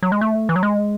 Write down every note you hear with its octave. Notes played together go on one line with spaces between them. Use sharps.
F#3
G#3
A3
E3
F#3
G#3